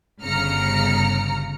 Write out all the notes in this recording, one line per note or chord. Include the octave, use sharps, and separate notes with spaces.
G1 C#3 A#5 F6 C#7